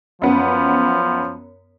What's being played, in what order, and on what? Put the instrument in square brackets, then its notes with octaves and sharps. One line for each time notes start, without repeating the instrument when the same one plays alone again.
[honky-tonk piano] F#2 B3 [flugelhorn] F3